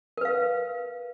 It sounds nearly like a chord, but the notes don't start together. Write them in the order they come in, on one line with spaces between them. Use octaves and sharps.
A#4 B4 F5